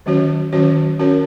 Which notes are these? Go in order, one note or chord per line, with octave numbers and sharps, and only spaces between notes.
D#3 F#3 C#4 F#4 C#5
D#3 F#3 C#4 F#4 C#5
C#4 F#4 A#4 C#5